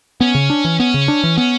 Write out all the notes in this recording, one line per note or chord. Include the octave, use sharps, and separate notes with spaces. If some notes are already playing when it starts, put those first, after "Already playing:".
B3 C#4
C#3
D4
E3
B3 C#4
C#3
D4
E3
B3 C#4